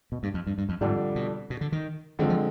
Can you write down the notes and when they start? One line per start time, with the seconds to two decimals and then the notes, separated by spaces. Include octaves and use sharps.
0.12 B2
0.23 G2
0.34 F2
0.47 G2
0.58 G2
0.69 F2
0.81 F2 G#2 D3 G3 D4
1.16 B2
1.50 B2
1.61 D3
1.72 D#3
2.19 F2 D3 D#3 G#3 C4
2.30 F3